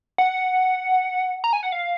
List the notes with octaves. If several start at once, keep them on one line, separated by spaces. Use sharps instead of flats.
F#5
A#5
G#5
F#5
F5